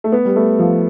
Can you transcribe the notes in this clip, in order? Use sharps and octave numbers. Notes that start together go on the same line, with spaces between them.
A3
B3
G3
A3
F3